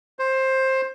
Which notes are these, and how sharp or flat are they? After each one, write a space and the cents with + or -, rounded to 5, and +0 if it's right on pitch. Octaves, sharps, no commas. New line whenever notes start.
C5 +15